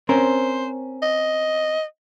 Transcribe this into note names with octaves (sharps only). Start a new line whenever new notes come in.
C4 C#4 A#4 C5
D#5